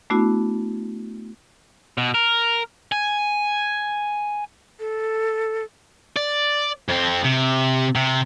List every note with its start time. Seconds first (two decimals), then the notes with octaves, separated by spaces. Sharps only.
0.10 A3 B3 D4 E4 F#4
1.98 B2
2.15 A#4
2.92 G#5
4.80 A4
6.17 D5
6.89 F2 C4
7.25 C3
7.96 C3